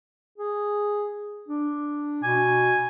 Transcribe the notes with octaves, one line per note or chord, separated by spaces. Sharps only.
G#4
D4
B2 G#5